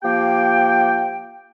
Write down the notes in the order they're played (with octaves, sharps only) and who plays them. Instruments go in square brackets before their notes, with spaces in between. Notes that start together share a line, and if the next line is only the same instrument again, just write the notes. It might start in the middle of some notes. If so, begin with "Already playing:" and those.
[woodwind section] F3 A#3 G4 G5